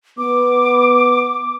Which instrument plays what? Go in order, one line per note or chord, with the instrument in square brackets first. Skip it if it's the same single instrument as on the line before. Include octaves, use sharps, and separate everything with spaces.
[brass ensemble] B3 [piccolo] D6